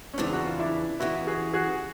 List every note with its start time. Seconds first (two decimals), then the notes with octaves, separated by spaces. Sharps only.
0.14 C#4
0.18 E2 C#3 E3 C4 D4
0.33 F#4
0.46 F4
0.59 D4 E4
1.00 E2 C#3 E3 E4 F#4
1.27 F#4 G#4
1.54 F#4 G#4